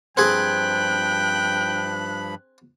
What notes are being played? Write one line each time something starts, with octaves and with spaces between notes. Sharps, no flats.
G2 F3 C4 G#4 G5 B5 F#6